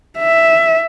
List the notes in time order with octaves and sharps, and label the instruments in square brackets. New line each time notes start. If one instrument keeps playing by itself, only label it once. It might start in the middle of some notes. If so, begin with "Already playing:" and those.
[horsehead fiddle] E5